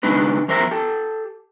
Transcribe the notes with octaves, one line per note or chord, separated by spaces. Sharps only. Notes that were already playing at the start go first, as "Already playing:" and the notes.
C#3 G#3 D4 D#4 B4
F2 A#4 C5 E5 A#5
G4 A4